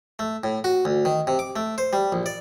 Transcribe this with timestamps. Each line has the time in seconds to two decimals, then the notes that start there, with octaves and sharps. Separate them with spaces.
0.19 A3
0.44 A2
0.64 F#4
0.85 D2
1.05 D#3
1.27 C3
1.39 D6
1.56 A3
1.78 C5
1.93 G3
2.12 A#1
2.26 D5